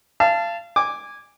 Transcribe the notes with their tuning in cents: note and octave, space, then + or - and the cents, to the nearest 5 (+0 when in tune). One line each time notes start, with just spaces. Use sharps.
F5 -30 A5 +0
G#5 -15 D6 +0